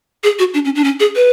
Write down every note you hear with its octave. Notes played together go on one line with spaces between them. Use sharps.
G#4
F#4
D4
C#4
D4
C#4
G#4
B4